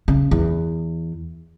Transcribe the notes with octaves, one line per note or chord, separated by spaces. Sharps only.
C#3
E2